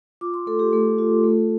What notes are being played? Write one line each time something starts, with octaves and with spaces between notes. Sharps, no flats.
F4 D6
C6
A3 A4
G4
A3 A4
F4
A3